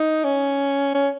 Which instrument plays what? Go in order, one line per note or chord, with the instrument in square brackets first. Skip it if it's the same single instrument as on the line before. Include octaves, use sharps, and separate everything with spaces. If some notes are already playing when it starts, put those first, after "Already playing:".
Already playing: [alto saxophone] D#4
C#4
C#4